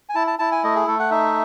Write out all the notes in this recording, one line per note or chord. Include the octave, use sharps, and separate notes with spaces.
G#5
E4 A5
A5
E4 A5
G#5
A3 D#5
G#4
A3 A4
F#5
D#4 E5